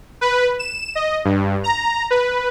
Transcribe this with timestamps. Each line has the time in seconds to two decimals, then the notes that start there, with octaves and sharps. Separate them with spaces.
0.21 B4
0.59 E7
0.95 D#5
1.25 G2
1.64 A#5
2.11 B4